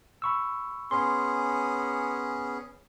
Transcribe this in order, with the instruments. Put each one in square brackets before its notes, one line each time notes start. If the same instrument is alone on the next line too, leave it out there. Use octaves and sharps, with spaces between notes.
[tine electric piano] B5 C#6 E6
[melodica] B3 C#4 G#4 [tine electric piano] C6